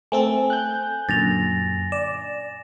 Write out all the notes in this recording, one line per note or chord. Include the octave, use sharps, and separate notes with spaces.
A3 C4 A4 G#5
F#6 G6
F#2 A#2 D3 A6 A#6 F7
D5 E7